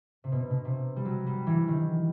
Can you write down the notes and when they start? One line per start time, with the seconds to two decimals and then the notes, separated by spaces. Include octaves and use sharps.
0.24 C3
0.32 B2
0.51 B2
0.65 C3
0.96 G3
1.05 F#3
1.27 G3
1.47 E3
1.68 D#3